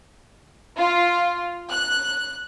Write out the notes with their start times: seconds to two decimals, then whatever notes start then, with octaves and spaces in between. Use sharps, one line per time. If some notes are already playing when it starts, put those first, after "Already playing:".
0.77 F4
1.71 F#6